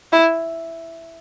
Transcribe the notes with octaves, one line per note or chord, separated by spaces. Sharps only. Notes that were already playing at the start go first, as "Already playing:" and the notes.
E4